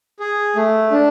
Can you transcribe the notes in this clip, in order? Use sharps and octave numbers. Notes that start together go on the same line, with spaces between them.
G#4
A3
D4